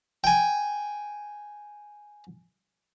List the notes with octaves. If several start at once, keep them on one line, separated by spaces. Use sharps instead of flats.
G5 G#5